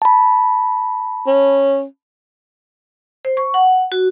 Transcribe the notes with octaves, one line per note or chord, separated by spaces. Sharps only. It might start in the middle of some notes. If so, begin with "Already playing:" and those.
A5 B5
C#4
C5
C#6
F#5
F#4